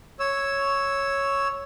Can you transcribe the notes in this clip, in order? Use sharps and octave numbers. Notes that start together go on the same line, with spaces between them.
C#5 E6